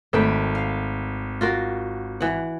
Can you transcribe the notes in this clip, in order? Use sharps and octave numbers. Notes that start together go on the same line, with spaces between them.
G#1 A3 B4 G5
F5
F4 F#4 A#4
E3 F#5